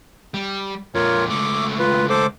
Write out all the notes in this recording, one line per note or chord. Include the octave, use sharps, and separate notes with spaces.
G3
F2 A#2 F4 A#4 C#5
C#2 A3 D6
F4 B4
A4 C5 D6